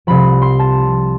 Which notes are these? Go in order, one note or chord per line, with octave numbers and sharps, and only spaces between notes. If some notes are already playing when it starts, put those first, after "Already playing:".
C2 C3 F3 B5
C6
A5